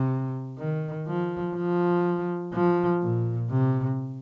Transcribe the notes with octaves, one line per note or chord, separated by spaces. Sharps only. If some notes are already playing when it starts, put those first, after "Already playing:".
Already playing: C3
D#3
F3
F3
F3
A#2
C3